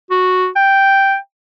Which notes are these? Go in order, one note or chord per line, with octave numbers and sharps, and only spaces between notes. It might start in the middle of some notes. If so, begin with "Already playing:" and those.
F#4
G5